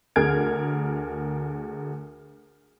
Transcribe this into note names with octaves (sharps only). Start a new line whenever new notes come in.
D2 G#4 A#4 F6 G#6 D7